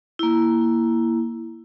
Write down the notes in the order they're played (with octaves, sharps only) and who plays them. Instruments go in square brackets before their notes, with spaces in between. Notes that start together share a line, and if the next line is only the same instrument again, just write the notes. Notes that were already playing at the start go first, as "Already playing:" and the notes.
[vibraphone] A#3 E4